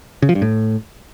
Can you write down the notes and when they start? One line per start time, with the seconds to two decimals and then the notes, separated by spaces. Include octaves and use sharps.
0.22 C#3
0.29 F3
0.35 G2
0.42 A2